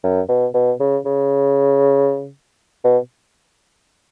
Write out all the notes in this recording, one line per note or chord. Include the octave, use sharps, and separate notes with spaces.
F#2
B2
B2
C#3
C#3
B2